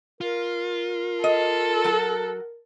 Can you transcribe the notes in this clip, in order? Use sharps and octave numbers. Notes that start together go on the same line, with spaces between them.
F4 A#4
A4 D#5
F#3 F#4